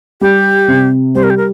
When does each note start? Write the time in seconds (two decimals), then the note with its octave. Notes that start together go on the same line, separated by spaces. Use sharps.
0.21 G3 G4
0.68 C3
1.15 G3 C5
1.23 A#4
1.30 G4
1.37 A#4